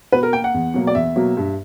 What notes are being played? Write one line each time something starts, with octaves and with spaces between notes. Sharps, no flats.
B2 B4
A#4
A#3 G5
F#5
E2
B2 F#3 A#3
D5
E2 E5
B2 F#3 A#3
G2